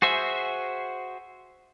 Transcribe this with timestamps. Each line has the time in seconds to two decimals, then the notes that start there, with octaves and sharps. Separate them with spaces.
0.02 F#4 G#4 C5 E5